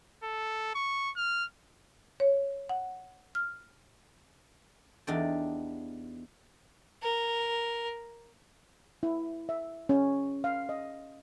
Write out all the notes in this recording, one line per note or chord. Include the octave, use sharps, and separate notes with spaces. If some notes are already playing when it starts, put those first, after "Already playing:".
A4
C#6
F6
C#5
F#5
F6
E2 D4 D#4 G4 D5
A#4
E4
E5
C#4
F5
D#5